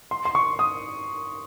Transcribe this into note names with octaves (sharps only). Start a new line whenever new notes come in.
C6
C6
C#6
D#6